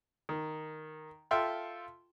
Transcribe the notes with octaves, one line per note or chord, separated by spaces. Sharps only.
D#3
F4 A4 E5 G5 C6 F6